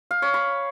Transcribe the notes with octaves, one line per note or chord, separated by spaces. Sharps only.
F5
C#5
B5